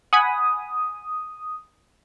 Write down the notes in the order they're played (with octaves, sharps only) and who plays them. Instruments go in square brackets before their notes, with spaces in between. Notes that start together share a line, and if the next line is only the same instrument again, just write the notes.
[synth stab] F#5 G#5 B5 [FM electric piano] D#6